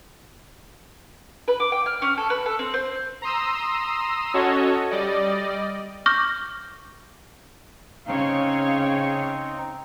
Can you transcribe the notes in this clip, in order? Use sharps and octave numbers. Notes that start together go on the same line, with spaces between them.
B4
D6
G5
F6
C#4
A4
B4
A4
C4
C5
A#5 C6 D#6 E6
C#4 F#4 A4 C#5 D#5
G3 D5 D#5
C#6 D6 F6 G6 A#6
C#3 C4 D#4 C#5 F5